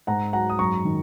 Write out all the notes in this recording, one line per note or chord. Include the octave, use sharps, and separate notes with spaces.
G#2 F#5 A#5
F#3 F#5 A#5
D#6
F#2 A#5 C#6
D#3